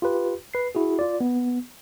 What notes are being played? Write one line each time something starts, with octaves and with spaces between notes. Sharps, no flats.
F4 G4 B4
B4 C7
E4 F#4 G#4
F4 D5
B3